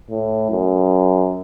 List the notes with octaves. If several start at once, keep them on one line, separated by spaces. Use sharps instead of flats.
A2
F#2